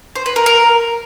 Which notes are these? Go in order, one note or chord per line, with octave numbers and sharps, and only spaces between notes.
C5
B4
A#4
A#4